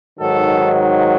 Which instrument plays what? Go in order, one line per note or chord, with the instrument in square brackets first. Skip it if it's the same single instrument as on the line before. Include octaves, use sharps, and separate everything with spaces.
[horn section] G#2 D#3 F#3 A4